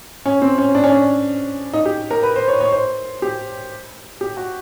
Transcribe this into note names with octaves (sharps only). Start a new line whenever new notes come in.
C#4
C4
C#4
D4
C#4
D4
D#4
G4
A#4
B4
C5
C#5
C#5
C5
G4
G4
F#4